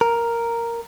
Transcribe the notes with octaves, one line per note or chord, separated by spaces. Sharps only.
A#4